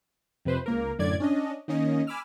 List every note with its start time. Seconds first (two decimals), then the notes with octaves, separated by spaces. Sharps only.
0.45 F2 C3 B4 C5
0.66 C#2 A#3 A#4
0.99 F#2 A2 D3 D5 G#6
1.20 C#4 D4 D#5
1.68 D#3 A#3 C#4 D#5
2.07 G#5 B5 D6 E6 F6